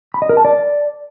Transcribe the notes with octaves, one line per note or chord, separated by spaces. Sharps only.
B5
D#5
A#4
A5
D5